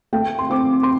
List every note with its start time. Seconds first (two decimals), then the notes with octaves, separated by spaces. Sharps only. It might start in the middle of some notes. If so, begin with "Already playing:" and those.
0.13 A3 G5
0.39 C6
0.50 C4 D6
0.83 C6